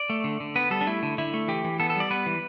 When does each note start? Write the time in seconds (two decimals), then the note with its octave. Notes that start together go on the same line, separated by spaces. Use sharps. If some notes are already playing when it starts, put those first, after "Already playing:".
Already playing: D5
0.10 A3
0.24 D3
0.40 D3
0.56 B3 B4
0.71 G3 A4
0.81 D4
0.87 A3 E4
1.03 D3
1.18 D3 E4
1.34 A3
1.48 E3 G4
1.64 E3
1.80 B3 A4
1.90 A4
1.96 G3 D5
2.11 B3 B4
2.26 E3